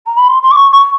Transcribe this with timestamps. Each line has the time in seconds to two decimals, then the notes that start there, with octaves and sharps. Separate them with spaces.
0.06 A#5
0.17 B5
0.28 C6
0.42 C6
0.51 D6
0.56 C#6
0.71 C#6